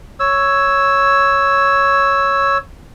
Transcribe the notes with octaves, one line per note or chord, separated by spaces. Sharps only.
C#5 E6